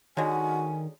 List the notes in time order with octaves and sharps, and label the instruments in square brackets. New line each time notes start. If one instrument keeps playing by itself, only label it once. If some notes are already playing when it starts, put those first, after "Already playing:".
[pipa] D3 F#3 G#3 [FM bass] D#3 [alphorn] F#4 [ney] G#5